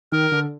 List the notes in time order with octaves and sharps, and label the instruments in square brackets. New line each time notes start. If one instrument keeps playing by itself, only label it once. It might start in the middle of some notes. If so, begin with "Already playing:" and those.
[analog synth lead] D#3 [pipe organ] A#4
[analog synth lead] D3